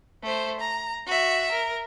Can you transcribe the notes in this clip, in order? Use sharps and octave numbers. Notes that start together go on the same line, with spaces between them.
A3 C5
A#5
F#4 E5
A#4